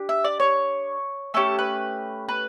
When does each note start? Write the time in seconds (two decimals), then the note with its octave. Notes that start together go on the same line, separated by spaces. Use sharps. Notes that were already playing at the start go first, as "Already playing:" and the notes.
Already playing: D4 G4
0.09 E5
0.24 D5
0.40 C#5
1.34 A3 C#4 G4 A4
1.59 B4
2.29 B4